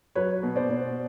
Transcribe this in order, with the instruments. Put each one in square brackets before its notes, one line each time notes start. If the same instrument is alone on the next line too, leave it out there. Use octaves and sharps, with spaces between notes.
[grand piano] F#3 B4 C#5
B2
C5 D5
B2